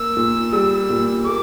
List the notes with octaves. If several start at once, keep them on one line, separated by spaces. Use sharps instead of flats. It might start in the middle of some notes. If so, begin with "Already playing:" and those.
Already playing: A#3 E6
A#2
G3 E6
A#2
A#3 D6